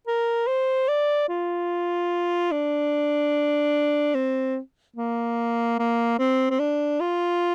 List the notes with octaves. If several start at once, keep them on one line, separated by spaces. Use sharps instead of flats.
A#4
C5
D5
F4
D4
C4
A#3
A#3
C4
C4
D4
F4